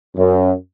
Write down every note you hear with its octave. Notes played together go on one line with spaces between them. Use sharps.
F#2